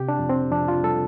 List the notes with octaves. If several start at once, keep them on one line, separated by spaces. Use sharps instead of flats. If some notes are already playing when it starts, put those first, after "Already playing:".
Already playing: C3 G4
D4
F2
C4
F2 D4
F4
G3 A4